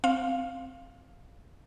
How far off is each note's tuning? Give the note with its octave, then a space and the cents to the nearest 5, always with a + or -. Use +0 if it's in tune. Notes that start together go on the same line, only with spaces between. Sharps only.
C4 +0 F5 +0